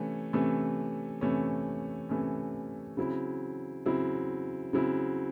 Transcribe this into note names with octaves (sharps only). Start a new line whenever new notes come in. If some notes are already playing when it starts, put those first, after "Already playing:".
Already playing: C3 E3 A3 C#4
C3 E3 A3 C#4
C3 E3 A3 C#4
C3 E3 A3 C#4
C#3 F#3 C4 E4
C#3 F#3 C4 E4
C#3 F#3 C4 E4